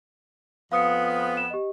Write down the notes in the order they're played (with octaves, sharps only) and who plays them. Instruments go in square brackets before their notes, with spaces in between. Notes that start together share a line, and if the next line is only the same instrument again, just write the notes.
[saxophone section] F2 F3 B3 [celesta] F5 D#6 C#7
[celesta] E7
G4 D#5